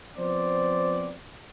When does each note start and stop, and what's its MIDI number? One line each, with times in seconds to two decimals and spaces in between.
0.17 1.14 53
0.17 1.14 59
0.17 1.14 60
0.17 1.14 72
0.17 1.14 74